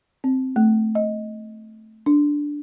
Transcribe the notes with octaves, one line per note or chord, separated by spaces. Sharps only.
C4
A3
D#5
D4